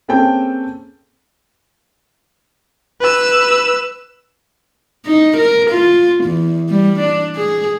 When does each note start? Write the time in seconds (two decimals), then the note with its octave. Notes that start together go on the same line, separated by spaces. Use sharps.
0.08 A#3 C4 C#4 G#4 A4 G5
3.01 B4 E6
5.06 D#4
5.37 A#4
5.70 F4
6.24 E2
6.69 G3
7.00 D4
7.36 G#4